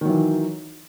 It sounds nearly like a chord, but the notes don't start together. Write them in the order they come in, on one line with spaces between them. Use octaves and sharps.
D#3 F#3 E3